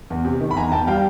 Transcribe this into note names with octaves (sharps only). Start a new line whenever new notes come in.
E2
C3
D#3
B5
E2 G#5 A#5
E2 G5 A5
G3 F5 G5